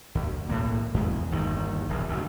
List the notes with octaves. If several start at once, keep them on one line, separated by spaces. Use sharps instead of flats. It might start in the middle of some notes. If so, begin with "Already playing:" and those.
D2
B1 A2 A#3
E2 G#3
G1 D#2 D#3
D#1 A#1 G2
F#1 D2